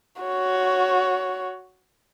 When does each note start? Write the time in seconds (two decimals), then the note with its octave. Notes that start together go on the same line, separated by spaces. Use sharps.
0.22 F#4 C#5